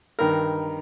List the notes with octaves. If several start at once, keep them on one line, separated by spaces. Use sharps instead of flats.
G2 D#3 A#4